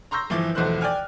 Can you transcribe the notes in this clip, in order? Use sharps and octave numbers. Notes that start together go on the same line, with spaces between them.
A#5 C6 C#6 E6 G6 A#6
G1 E3 F3 D6
B1 E2 F3 A3 C5 F#6
D5 G5 G#5 F6